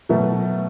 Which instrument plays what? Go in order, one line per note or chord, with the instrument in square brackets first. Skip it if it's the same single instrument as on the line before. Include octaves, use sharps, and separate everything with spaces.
[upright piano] B2 F#3 A3